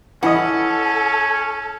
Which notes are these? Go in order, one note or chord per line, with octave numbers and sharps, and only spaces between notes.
E3 C#4 A4 D#5 F#5